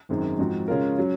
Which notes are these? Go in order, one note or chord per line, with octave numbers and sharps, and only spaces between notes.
G#1 F#2 D#3 G#3 C4
G#2 F3 C4 F#4
C#3 G#3 C#4 F4 A#4
F#3 C#4